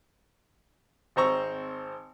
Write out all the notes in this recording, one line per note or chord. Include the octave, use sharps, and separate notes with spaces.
G#1 C4 C5 A#5 C#6 E6